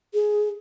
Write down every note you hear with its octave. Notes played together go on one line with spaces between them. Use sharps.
G#4